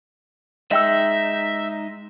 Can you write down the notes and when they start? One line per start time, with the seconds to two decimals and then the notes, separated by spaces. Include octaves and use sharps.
0.71 G#3 D#4 D#5 E5 G5 E6